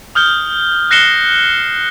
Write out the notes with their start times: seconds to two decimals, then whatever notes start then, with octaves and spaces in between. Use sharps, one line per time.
0.15 D#6 F6 G6 G7
0.91 F#6 A#6 C7 C#7 E7 G7